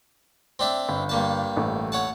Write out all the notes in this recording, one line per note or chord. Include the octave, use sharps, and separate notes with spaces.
C4 D4 E5
G1
G2 A#3 A5
A1 A3
C#5 F#5 A5